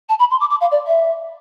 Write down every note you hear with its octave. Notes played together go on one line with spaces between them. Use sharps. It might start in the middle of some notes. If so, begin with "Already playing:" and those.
A5
B5
C6
D6
D6
F5
D5
E5